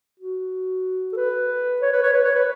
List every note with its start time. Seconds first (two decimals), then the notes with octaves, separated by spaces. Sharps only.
0.20 F#4
1.13 A4
1.17 B4
1.82 C#5
1.92 B4
2.03 C#5
2.13 B4
2.24 C#5
2.35 B4